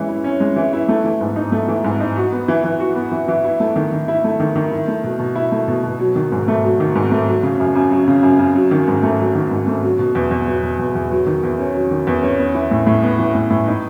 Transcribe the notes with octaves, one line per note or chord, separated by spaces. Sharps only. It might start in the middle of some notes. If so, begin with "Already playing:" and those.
Already playing: E3 G#3 C#4
E4
C#4
G#3
E3
E4
A3
E3
G#2
D#4
A3
E3
G#2
D#4
F#4
B3
E3
E3
F#4
B3
E3
E3
E4
A3
D#3
D#3
E4
A3
D#3
D#3
E4
A3
B2
B2
E4
A3
B2
B2
F#3
D#3
G#2
A3
F#3
D#3
G#2
A3
F#3
C#3
F#2
F#2
F#3
C#3
F#2
F#2
F#3
D#3
G#2
A3
F#3
D#3
G#2
A3
F#3
B2
E2
E2
F#3
B2
E2
E2
F#3
D#3
E2
C#4
F#3
D#3
E2
C#4
B3
E3
A2
A2
B3
E3
A2
A2
D#4